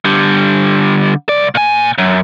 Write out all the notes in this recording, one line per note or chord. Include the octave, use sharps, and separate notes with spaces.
D3 G3
C2 D5
A#2 G#5
F#2